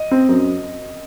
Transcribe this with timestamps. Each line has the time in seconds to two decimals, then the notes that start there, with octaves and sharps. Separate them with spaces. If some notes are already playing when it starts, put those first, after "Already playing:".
Already playing: D#5
0.11 C4
0.29 F#2